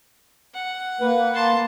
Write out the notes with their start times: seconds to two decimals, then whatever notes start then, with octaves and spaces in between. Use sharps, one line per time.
0.54 F#5
1.01 A#3 B4
1.34 A5 C6